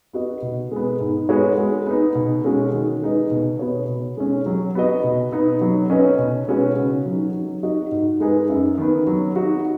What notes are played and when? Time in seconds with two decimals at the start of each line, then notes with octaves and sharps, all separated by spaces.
0.13 B3 F#4 D#5
0.42 B2
0.71 G#3 B3
1.00 G#2
1.29 G#3 B3 F#4 C#5
1.58 G#3
1.87 B3 D#4
2.15 B2
2.44 G#3 C#4 F#4
2.73 D#3
3.02 G#3 D#4 B4 D#5
3.31 B2
3.59 B3 F#4 C#5
3.88 B2
4.17 G#3 C#4
4.46 F#3
4.75 B3 F#4 D#5
5.04 B2
5.32 B3 D#4
5.61 F#3
5.90 C#4 B4 D#5
6.18 B2
6.48 G#3 C#4 F#4 B4
6.77 C#3
7.06 F#3 D#4
7.34 F#3
7.63 D#4 F#4 D#5
7.92 G#2
8.20 G#3 D#4 G#4 B4
8.50 F#2
8.78 D#3 B3
9.07 F#3
9.36 D#4 F#4